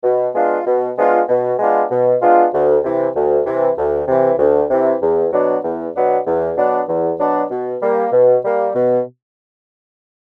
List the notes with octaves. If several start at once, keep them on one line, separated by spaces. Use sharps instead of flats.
B2
G#3 B3 D4 F4
B2
G#3 B3 D4 F4
B2
G#3 B3 D4 F4
B2
G#3 B3 D4 F4
D2
C3 E3
D2
C3 E3
D2
C3 E3
D2
C3 E3
E2
B2 F#3 B3 D4
E2
B2 F#3 B3 D4
E2
B2 F#3 B3 D4
E2
B2 F#3 B3 D4
B2
G3 A#3
B2
G3 A#3
B2